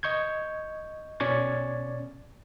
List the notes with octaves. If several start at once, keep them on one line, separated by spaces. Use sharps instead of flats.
D#5 C#6 G6 G#6
B2 C#4 D5 C#6 G#6 A6